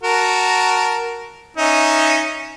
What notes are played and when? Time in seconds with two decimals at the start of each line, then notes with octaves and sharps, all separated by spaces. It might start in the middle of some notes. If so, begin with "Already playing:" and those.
0.03 F#4 A#4 A5
1.57 C#4 D#4 E5